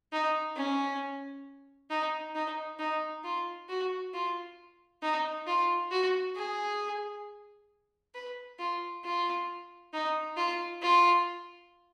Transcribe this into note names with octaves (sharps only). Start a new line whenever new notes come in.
D#4
C#4
D#4
D#4
D#4
F4
F#4
F4
D#4
F4
F#4
G#4
B4
F4
F4
D#4
F4
F4